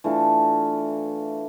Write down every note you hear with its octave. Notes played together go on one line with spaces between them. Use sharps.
E3 A3 D4 F4